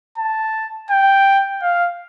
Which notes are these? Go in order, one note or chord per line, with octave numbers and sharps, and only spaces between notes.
A5
G5
F5